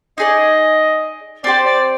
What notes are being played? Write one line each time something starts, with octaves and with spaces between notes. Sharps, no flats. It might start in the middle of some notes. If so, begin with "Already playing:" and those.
D#4 G#4 D5 D#5
C4 G4 C5 D5
D5